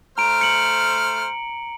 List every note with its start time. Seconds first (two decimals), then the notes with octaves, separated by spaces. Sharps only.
0.18 A3 C5 A#5 F6 D7
0.41 C#7 F#7